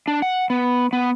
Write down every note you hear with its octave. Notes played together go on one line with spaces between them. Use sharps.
D4
F#5
B3
B3